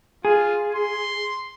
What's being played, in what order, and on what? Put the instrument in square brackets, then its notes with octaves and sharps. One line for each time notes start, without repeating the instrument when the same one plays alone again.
[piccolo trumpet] F4 [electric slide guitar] G#4
[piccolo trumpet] C6